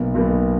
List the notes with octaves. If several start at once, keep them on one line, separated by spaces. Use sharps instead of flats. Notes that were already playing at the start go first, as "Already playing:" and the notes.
Already playing: B1 B2 A#3
B1 B2 A#3